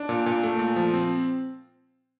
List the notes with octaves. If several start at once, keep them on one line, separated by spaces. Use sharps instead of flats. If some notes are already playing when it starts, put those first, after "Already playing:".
Already playing: D4
A#2
A#2
A3
A#2
F3
C4